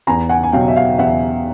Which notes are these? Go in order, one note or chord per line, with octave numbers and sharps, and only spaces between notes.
E2 G#5 A#5
F#5 G#5
G#5
B2 F#3 F5 G5
E5
F5
E2 E5 F#5